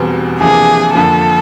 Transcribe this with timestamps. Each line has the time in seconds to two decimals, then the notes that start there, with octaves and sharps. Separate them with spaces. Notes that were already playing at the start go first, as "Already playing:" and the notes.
Already playing: E1 E2 B2 G3 C4
0.40 E2 C3 F3 A#3 D4 G#4
0.95 F2 D3 F3 A#3 A4